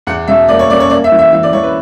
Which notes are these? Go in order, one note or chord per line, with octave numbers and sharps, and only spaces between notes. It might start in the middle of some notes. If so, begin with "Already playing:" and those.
E2 F#5
B2 E5
A#3 D5
C#5
A#3 D5
C#5
A#3 D5
E5
E3
E5
E3 E5
D5
E3 C#5
B4